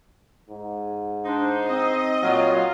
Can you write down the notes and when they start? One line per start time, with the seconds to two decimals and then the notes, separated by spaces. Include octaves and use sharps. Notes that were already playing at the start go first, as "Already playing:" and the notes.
0.50 G#2
1.25 D4 D#4 C5
1.68 C4 D#5
2.23 A#2 F#3 F4